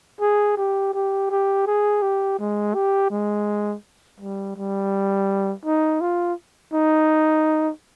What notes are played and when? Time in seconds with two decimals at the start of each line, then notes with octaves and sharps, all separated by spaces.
0.21 G#4
0.57 G4
0.94 G4
1.30 G4
1.67 G#4
2.02 G4
2.39 G#3
2.74 G4
3.11 G#3
4.20 G3
4.56 G3
5.65 D#4
6.01 F4
6.73 D#4